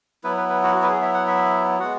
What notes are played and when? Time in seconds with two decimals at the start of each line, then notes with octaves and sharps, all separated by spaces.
0.24 F#3 B3 E4 B4
0.37 B4
0.49 B4
0.63 F#4
0.76 F#4
0.83 B4
0.89 G#4
1.02 E5
1.14 F#5
1.27 E5
1.79 G#3 B3 F#4 F#5